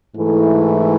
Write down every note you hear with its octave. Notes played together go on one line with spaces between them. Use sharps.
G#2 E3 A3 E4 A4